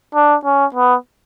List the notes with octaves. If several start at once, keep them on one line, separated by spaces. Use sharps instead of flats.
D4
C#4
B3